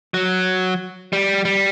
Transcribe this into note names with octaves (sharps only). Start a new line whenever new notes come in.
F#3
G3
G3